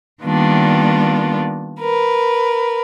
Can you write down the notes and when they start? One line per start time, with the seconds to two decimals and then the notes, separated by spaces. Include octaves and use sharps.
0.22 D#3 G3 A#3 B3 D4 F4
1.79 A#4 B4